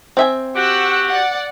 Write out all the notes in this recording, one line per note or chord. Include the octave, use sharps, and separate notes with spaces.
C4 E5 G#5
F#4 G4 F#5 E6 F#6
D5 F#5